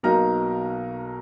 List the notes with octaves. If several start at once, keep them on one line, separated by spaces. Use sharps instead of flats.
B1 B2 F#3 A#3 D#4 A#4 A#5